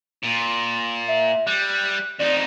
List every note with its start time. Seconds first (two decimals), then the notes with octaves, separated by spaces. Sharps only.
0.23 A#2
1.08 E5
1.47 G3 F#6
2.19 F2 D#4 D5